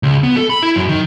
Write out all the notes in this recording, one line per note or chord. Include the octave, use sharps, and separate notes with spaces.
C#2
B3
A4
B5
E4
F#2
D#3